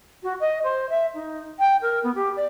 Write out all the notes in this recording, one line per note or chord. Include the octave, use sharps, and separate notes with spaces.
F#4
D#5
C5
E5
D#4
G5
A#4
B3
G4
D5